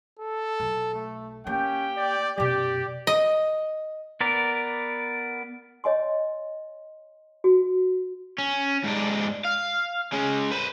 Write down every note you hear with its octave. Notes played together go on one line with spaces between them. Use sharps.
A4
B1
A3
A#3 C#4 G4 G5
D5
F#2 B2 G4 D5
D#5
B3 A#4 D5
C#5 D#5 G#5 C6
F#4
C#4
G#2 D4
F5
G#3 C#4
B4 C5